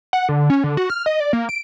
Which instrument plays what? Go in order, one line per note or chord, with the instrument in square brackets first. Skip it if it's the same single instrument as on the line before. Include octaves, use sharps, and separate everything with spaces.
[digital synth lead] F#5
D3
C#4
D3
F#4
F6
D#5
D5
A#3
D7